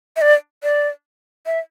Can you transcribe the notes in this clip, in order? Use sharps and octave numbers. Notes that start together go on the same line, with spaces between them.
E5
D5
D5
E5